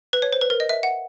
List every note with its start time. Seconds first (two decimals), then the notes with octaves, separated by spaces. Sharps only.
0.13 B4
0.22 C#5
0.33 C5
0.41 B4
0.50 A#4
0.60 D#5
0.69 E5
0.83 F#5